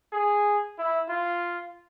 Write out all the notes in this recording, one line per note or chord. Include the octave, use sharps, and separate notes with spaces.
G#4
E4
F4